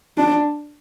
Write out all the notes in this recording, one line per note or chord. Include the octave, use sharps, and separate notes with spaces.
D4